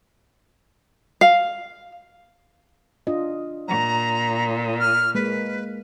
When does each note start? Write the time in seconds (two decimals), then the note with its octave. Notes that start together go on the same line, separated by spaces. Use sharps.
1.21 F5
3.07 D4 F4 D#5
3.68 A#2 A#5
4.80 F6
5.15 G#3 A#3 B4